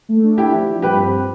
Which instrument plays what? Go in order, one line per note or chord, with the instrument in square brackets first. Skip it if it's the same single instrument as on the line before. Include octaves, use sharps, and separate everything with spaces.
[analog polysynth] A3
D4
[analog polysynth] C4 [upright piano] E4 G4
[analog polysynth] F3
F3
[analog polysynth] G2 [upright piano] G4 B4
[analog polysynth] C4